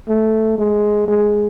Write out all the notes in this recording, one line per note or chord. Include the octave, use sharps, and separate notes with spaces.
A3
G#3
G#3